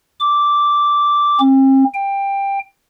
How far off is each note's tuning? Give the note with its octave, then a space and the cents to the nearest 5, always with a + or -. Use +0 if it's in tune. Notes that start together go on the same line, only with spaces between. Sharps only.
D6 -5
C4 +40
G5 +15